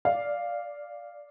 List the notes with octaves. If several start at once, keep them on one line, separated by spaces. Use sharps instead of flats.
D5 F5